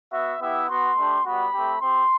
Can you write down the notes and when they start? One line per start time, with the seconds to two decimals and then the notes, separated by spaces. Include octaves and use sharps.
0.12 B3 F#4 E5
0.41 B3 E4 G4 E5
0.69 B3 F#4 C6
0.97 A3 D4 G4
1.25 G3 B3 F#4 B5
1.54 A3 C4 G4
1.81 C4 G4 C6